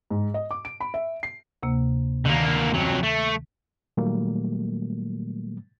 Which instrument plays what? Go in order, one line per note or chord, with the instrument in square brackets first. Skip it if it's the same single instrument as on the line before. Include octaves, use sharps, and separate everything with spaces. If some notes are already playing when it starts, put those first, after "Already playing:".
[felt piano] G#2
D#5
D6
D7
B5
E5
C7
[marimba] D2 C3 A#3
[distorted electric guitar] D3 A#3 [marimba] D#3
[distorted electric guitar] F2 F#3
A3
[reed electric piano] A#2 D#3 F#3 G3 A3 A#3